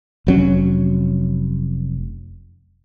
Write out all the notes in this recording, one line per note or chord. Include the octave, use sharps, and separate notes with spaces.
F1 F#3 C#4